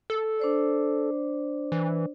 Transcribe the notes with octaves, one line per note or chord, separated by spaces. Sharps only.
A4
D4 C5 D5
E3